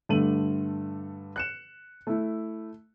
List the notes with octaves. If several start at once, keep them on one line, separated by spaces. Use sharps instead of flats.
G2 D3 A3 D#7 F#7
F#6 C#7 E7
A3 E4